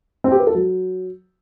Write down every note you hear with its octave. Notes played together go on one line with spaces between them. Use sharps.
C4
G4
B4
A4
F#3